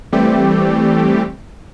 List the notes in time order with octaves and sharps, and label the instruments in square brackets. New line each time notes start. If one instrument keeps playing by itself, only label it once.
[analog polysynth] E3 G3 A3 C4 G4